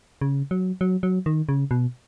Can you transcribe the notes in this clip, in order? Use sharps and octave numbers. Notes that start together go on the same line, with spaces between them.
C#3
F#3
F#3
F#3
D#3
C#3
B2